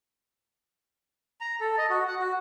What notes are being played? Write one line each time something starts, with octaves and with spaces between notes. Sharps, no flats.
A#5
A4
D#5
F#4
F#5
F#4